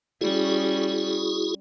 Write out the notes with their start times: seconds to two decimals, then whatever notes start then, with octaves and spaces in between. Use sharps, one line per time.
0.21 G3 C#4 E4 F#4 G#4